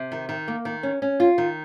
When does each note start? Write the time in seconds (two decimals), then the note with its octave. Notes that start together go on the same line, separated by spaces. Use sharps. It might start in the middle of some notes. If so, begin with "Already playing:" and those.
Already playing: C3
0.12 D#3
0.29 D#3
0.48 A#3
0.65 D#3
0.83 C#4
1.02 C#4
1.20 F4
1.38 D#3